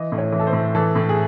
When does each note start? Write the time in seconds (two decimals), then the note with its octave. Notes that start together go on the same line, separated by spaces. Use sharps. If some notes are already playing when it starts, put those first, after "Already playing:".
Already playing: E3 D#5
0.12 A2
0.18 C#5
0.32 E3
0.40 A4
0.47 C5
0.53 A2
0.75 E3 A4
0.95 A2
1.09 G#4